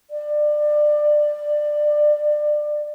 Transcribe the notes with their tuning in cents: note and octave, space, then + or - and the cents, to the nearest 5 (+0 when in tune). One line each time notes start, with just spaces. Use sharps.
D5 +25